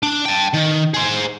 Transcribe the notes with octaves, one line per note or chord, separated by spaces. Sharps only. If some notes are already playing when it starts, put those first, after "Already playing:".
D4
G5 A5
D#3
G#4 C5